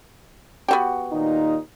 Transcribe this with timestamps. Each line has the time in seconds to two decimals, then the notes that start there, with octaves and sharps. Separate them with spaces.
0.68 B3 F#4 G4
1.12 D#2 A#2 D#4